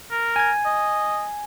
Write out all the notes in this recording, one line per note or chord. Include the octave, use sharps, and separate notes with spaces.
A#4
G#5 G#6
D#5